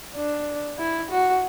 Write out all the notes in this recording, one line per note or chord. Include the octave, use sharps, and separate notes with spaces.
D4
E4
F#4